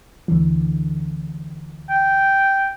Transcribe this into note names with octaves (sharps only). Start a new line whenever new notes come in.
D2 D3 E3
G5